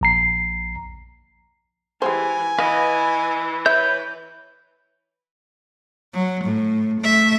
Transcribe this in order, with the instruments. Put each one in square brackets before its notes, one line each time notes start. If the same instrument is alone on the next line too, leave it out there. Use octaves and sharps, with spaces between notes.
[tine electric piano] A#1 A#5 C7
[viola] E3 [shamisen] G#3 G4 C5 [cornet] G#5
[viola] E3 [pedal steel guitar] B4 D#5 [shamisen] F5
[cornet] B4 [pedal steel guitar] C#5 G6 [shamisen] E5
[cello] F#3
A2
A3 E5